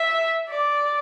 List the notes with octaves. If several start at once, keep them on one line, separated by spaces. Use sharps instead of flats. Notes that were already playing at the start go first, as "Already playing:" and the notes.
Already playing: E5
D5